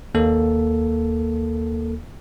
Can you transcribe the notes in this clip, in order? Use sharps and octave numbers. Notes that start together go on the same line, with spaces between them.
D#2 A#3 A4